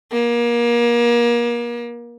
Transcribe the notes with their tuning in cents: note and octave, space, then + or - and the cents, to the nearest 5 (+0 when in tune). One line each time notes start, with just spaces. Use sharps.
A#3 +30